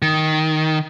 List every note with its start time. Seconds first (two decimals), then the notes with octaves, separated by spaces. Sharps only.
0.02 D#3